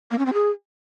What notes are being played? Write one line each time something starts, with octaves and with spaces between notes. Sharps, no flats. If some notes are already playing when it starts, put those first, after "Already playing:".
A#3
C#4
C4
G#4